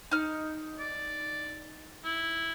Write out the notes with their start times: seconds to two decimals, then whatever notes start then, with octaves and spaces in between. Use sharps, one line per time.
0.11 D#4 F6
0.79 D5
2.05 E4